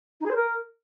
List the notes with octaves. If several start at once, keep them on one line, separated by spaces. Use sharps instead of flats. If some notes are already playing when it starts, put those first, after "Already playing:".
D#4
G#4
C5
A#4